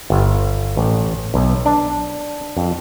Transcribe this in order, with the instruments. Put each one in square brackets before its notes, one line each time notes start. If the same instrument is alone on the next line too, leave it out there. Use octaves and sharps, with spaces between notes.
[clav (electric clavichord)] G1
A1
B1
D4
F2